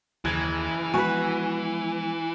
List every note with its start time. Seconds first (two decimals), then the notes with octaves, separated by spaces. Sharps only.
0.25 F#1 D#2 E3 G#6
0.94 F3 G#3 B3 F#4 B4 G#5